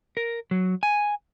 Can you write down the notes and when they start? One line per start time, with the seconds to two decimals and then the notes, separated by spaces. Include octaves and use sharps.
0.17 A#4
0.51 F#3
0.83 G#5